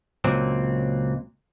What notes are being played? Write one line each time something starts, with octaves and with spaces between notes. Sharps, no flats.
C#2 A#2 F#3 C4